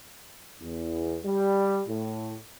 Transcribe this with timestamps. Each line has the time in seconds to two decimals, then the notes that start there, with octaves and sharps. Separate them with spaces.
0.61 E2
1.24 G3
1.87 A2